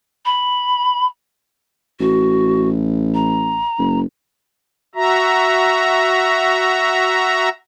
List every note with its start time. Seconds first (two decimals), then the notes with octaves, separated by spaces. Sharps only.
0.25 B5
2.00 A1 F#4
3.14 A#5
3.78 F#1
4.95 F#4 E5 A#5